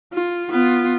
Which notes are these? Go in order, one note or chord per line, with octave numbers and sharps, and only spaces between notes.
F4
B3 F4